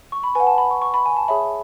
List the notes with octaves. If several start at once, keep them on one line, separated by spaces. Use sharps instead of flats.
C#6
B5
B4 F#5 G#5
A5
B5
C#6
C#6
B5
G#5
A5
G#4 C#5 E5 B5